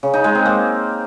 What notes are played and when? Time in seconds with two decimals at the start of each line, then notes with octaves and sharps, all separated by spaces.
0.03 C#3
0.14 D#4
0.24 G#3
0.35 C4
0.45 A#3